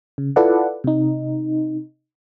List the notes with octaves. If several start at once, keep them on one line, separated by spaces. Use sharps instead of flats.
C#3
E4 F4 A4 B4 D5 F#5
C3 D#4